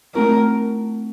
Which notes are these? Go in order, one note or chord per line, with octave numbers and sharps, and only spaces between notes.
A3 C4 E4 A#4